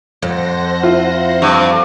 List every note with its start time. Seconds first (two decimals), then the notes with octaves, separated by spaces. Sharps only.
0.22 F2 C5 F#5 A#6
0.83 E4 F4
1.42 G2 C#6